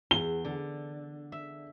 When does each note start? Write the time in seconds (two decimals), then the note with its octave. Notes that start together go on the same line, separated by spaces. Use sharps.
0.11 E2 G7
0.45 D3
1.32 E5